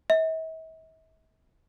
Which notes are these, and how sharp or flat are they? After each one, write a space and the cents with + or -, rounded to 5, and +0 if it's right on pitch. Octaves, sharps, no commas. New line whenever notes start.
E5 -45